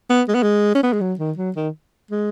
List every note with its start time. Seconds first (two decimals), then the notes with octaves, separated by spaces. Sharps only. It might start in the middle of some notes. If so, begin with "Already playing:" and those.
0.10 B3
0.28 G#3
0.35 B3
0.43 G#3
0.75 C#4
0.83 B3
0.93 G#3
1.01 F#3
1.19 D#3
1.37 F#3
1.56 D#3
2.11 G#3